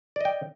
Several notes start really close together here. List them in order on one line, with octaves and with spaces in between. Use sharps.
D5 D#5 G5